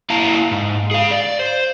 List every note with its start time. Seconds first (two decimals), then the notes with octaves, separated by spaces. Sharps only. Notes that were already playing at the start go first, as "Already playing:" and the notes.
0.10 A#3 E4 F5 A5 A#5
0.51 G#2
0.91 G#4 F5
1.11 D5
1.39 C5